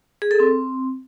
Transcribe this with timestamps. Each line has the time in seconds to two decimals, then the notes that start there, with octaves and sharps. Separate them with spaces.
0.22 G#4
0.31 A4
0.40 C4